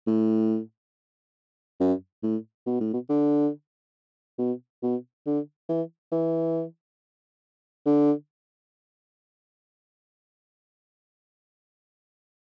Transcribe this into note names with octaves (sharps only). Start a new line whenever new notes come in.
A2
F#2
A2
B2
A2
B2
D3
B2
B2
D3
E3
E3
D3